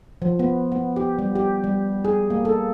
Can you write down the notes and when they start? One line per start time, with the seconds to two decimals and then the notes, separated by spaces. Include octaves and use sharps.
0.22 F3
0.39 B3
0.72 B3
0.96 G4
1.19 G3
1.36 G4
1.64 G3
2.05 G#4
2.30 A#3
2.45 A4